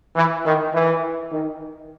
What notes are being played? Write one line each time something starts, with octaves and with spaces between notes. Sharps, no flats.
E3
D#3
E3
D#3